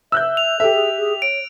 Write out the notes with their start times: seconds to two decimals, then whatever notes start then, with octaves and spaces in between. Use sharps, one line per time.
0.12 E5 E6 F#6 G6
0.37 F7
0.60 G4 A4 E5
0.74 G#4
0.97 G#4
1.22 C#5 D7